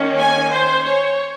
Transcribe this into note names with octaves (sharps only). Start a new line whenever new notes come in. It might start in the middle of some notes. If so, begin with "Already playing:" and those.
Already playing: D#3 A#3 C#4
G#5
C5
C#5